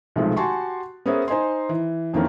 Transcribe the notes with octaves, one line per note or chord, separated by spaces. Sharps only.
B1 C3 D#3 F3 G#3 A3
F#4 G4 G#5 A5 C6 C#6
B3 C#4 G#4 A#4 C5 E5
D#4 C5 D#5 G#5 C6
E3
F2 D#3 E3 A#3 C4 C#4